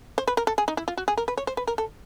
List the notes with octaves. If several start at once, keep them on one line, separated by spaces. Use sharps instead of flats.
C5
B4
A#4
A4
G#4
D#4
E4
F4
F#4
G#4
A#4
B4
C#5
C5
B4
A#4
A4